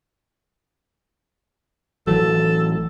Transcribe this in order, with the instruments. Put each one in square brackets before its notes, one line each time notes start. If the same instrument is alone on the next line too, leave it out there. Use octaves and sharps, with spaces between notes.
[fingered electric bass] A1 E3 F#3 [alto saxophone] A4